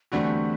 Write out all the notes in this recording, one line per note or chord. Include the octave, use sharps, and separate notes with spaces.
E2 D3 G3 A3 C4 F#4